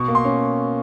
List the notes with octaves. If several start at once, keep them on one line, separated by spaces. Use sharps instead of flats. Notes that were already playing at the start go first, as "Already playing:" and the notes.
Already playing: B2 C#6
A#3
C6
C#4